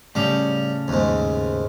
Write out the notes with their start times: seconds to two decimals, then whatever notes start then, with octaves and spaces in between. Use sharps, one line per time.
0.15 A2 C#3 G3 C#4
0.88 D#2 G#2